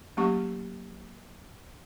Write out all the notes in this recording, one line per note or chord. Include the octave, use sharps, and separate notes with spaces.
F#3 A3 A#3 C#4 G4 C#6